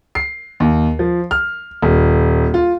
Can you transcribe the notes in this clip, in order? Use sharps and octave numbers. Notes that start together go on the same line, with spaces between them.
C7
D#2
F3
F6
D#1
F4